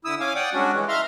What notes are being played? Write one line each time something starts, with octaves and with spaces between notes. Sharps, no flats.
D3 E4 D#6 E6
C#4 F5 G#5 D6
D5 F#5 G5 D#6
G3 G#3 C#4 D4 F#4
E3 G#3
E5 F5 A#5 C6 F6